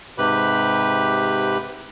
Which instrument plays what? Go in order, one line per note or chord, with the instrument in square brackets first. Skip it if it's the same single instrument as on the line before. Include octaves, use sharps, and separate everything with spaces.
[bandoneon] G#2 C3 G4 B4 B5